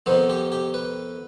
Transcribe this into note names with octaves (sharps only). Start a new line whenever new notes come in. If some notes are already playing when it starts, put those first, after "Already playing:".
F2 D#3 B3 C5
G4
G4
B4